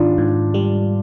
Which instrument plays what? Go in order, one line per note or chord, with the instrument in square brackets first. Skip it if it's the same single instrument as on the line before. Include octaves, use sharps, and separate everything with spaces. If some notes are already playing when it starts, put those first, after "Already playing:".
Already playing: [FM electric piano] G#2 D#3 [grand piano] D4 F4
[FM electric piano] G#2
G3